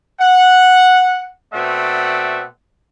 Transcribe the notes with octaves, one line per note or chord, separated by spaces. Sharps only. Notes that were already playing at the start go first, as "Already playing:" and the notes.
F#5
B2 A3 C4 D5 E5 F#5